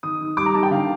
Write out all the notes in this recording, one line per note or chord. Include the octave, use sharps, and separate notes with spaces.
D#3 D#6
D#3
G3 D6
A#5
D#3 A5
G5
D3 F5